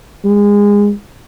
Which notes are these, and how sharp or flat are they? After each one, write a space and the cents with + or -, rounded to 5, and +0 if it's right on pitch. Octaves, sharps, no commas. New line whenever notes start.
G#3 -25